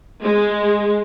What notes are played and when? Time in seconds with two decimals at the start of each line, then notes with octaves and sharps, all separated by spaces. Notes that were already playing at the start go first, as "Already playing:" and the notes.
0.22 G#3